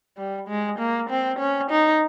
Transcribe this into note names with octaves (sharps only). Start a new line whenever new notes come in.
G3
G#3
A#3
C4
C#4
D#4